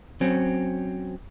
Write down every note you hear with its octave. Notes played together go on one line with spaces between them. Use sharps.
F#3 C4 C#4